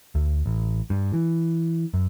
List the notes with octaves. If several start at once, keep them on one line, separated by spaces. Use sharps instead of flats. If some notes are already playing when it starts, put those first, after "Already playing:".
D2
A1
G2
E3
F#2